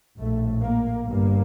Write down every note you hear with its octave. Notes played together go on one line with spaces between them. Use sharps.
A#1 A2 A3
A#3
G1 G2 A#3